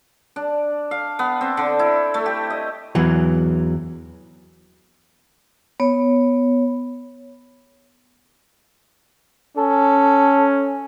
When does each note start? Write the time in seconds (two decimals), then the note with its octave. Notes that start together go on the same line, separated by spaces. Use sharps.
0.36 D4
0.91 F5
1.19 B3
1.41 C4
1.57 D3
1.79 E4
2.14 A3
2.26 G4
2.50 D#5
2.95 E2 E3 F#3
5.80 B3 C#5
9.57 C#4 A4